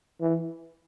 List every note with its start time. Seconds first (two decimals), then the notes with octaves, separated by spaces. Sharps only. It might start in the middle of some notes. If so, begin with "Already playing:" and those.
0.21 E3